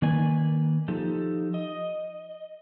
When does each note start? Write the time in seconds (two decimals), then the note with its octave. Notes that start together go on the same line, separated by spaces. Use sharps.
0.02 D#3 A#3 B4 D5 G#5
0.88 F3 D#4 G4 A4
1.54 D#5